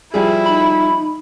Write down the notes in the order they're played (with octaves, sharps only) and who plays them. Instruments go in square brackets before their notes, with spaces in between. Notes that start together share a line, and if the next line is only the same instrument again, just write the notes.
[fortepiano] F3 G3 G#4 [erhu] E4
[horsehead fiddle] D#4 [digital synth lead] B5